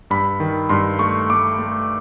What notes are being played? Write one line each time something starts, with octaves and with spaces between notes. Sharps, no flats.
G2 B5
D#3
G2 C6
A3 C#6
A3 D6
A3